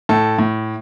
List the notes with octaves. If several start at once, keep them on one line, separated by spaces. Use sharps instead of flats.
A2 A4
A2